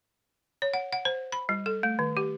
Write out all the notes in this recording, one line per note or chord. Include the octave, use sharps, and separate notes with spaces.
C#5
F#5
F#5
C5
B5
G3
A4
A3
D#3
G4